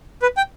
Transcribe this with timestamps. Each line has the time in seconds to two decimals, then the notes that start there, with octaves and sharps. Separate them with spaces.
0.22 B4
0.37 G5